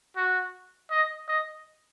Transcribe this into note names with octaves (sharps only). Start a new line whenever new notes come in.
F#4
D#5
D#5